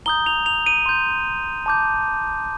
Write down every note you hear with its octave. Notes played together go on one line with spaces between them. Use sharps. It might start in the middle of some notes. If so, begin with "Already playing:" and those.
A#5 D#6 G6 G7
F7
F7
D#7
C6 G6
A5 D6 G6